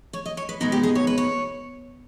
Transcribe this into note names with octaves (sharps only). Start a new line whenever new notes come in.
C#5
D#5
C#5
B4
B2 G#3 B3 D#4 A#4
G4
G#4
C#5
B4
C#5